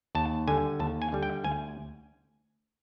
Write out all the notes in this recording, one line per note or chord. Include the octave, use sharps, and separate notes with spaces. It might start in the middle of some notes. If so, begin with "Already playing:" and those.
D#2 A5
D3 G3 G#5
D#2 A5
G#5
D3 G3
G5
D2 G#5